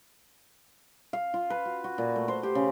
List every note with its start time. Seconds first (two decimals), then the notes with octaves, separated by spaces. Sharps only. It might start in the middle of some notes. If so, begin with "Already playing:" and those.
1.13 F5
1.34 F4
1.50 B4
1.65 F#4
1.84 F#4
1.98 A#2
2.16 A3
2.28 C5
2.43 G4
2.55 C#3